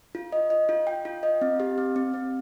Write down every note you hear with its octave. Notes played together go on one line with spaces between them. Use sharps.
F4
D#5
D#5
F4
G5
F4
D#5
C4
G4
C4
C4
C4